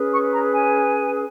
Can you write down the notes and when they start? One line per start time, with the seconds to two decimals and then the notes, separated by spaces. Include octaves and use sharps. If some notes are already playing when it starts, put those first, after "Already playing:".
Already playing: C#4 G#4 B4
0.12 C#6
0.33 A#5
0.53 G#5